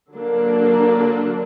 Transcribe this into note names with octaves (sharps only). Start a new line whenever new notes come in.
D3 F#3 A#3 D4